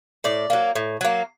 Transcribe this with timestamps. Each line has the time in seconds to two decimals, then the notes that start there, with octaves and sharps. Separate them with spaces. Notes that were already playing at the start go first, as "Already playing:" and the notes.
0.24 A2 D5
0.50 F#3 A#3
0.76 A2
1.01 F#3 A#3